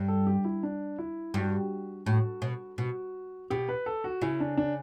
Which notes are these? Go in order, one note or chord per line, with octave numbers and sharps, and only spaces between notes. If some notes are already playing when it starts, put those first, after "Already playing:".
Already playing: G2
A4
G4
E4
D4
E4
G2 F#4
A2 F#4
B2
B2 F#4
B2 G4
B4
A4
F#4
C#3 E4
D4
D4